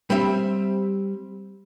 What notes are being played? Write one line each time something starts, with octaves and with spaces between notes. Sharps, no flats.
G3 C4 C5 E5